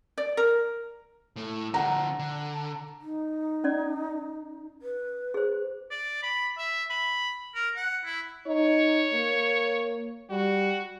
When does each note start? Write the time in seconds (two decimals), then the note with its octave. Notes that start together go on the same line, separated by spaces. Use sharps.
0.18 D5
0.37 A#4
1.36 A2 A3
1.74 D3 F3 F#5 A#5
2.19 D3
3.01 D#4
3.64 C#4 D5
4.82 B4
5.34 G#4 C5
5.91 D5
6.23 B5
6.58 E5
6.90 B5
7.55 A#4
7.76 F#5
8.05 E4
8.47 D#4 C#5
9.12 A#3
10.30 G3 F#4